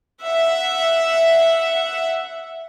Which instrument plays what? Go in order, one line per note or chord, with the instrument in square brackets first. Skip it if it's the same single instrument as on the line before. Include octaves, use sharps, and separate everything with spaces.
[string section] E5 F#5